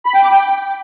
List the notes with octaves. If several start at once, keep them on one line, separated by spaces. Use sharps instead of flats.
B5
G5
D6
G5